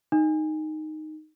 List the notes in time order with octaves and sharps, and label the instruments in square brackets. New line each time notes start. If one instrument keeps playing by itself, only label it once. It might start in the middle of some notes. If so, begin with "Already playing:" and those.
[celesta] D#4